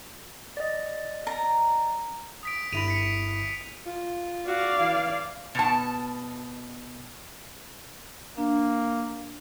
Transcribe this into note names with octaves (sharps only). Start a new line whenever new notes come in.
D5 D#5
A#5
D#6 B6 D7
G1 E4 B5 D7 D#7 F7
B6 C#7
F4
F#4 D5 F5
E3
B2 A5
A#3 D4